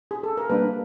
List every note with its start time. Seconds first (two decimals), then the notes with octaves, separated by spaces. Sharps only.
0.11 G#4
0.23 A4
0.37 A#4
0.49 G3 A#3 D4 B4